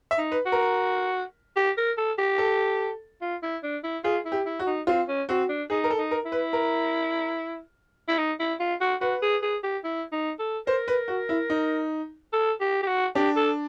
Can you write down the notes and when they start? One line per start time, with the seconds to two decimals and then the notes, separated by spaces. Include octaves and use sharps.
0.11 E5
0.18 D#4
0.32 B4
0.46 F#4
0.52 A#4
1.56 G4
1.77 A#4
1.98 A4
2.18 G4
2.38 A4
3.21 F4
3.43 E4
3.63 D4
3.84 E4
4.04 F4 G#4
4.25 E4
4.32 G4
4.46 E4
4.59 F#4
4.67 D#4
4.87 C4 F4
5.08 C#4
5.29 C4 F#4
5.49 D4
5.70 D#4 G#4
5.84 A#4
5.90 A4
5.98 D#4
6.11 A#4
6.25 E4
6.32 B4
6.53 A#4
8.08 E4
8.18 D#4
8.40 E4
8.60 F4
8.81 F#4
9.01 F#4 B4
9.22 G#4
9.43 G#4
9.63 G4
9.84 E4
10.12 D#4
10.39 A4
10.67 A#4 C5
10.88 B4
11.08 F#4
11.29 E4
11.50 D#4
12.33 A4
12.60 G4
12.83 G4
12.88 F#4
13.15 D4 G4
13.36 A4